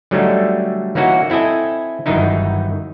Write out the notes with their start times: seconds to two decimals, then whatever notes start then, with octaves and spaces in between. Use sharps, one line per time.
0.11 D3 F#3 G3 A3 C#4 D#4
0.95 E3 A#3 C#4 D#4 F#4
1.30 C4 E4 A4 D#5 G#5
2.06 G1 F#2 D#3 E3 D#4 E4